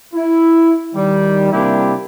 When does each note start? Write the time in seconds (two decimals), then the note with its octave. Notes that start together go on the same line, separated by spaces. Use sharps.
0.14 E4
0.95 D#3 G3
1.52 C3 G3 A#3 D4 E4 G4